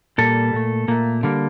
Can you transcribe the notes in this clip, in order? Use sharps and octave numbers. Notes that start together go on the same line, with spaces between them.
A#2 G3 A#3 A4
A#2 A3
A#2 A3 A#3
D3 G3 A#3